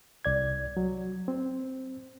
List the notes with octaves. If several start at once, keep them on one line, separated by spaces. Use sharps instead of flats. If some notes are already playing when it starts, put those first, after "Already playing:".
C2 D5 G#6
F#3
C4